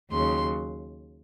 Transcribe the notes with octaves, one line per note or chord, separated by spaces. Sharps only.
D#2 C#3 F#3 C6